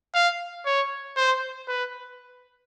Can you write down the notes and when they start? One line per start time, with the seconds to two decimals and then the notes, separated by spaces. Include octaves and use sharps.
0.14 F5
0.66 C#5
1.16 C5
1.68 B4